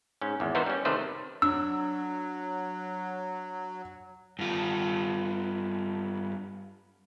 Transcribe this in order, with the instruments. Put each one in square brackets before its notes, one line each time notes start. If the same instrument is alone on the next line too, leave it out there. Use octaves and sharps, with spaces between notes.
[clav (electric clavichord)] G#2 C#4
G#1 E2
E3 B3 D#4 F#4 A#4 C5
G3 C#4
C3 D#3 A3 B4 C5
[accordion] F#3 [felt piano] D4 [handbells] E6
[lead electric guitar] G2 F4